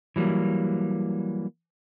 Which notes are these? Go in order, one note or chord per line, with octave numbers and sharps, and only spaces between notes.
E3 F#3 G3 A#3